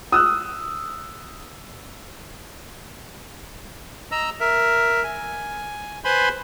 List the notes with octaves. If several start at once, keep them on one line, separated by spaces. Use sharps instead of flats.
D#6 E6 F#6
D#5 A#5 E6
A#4 E5
G#5
B4 C5 G#5 B5 C6